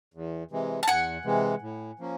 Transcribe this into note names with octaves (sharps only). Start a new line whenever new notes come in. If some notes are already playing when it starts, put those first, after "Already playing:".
E2
C3 E3 G#3
A5
E2 F#5 G#5
C3 E3 G#3
A2
F3 A#3 C#4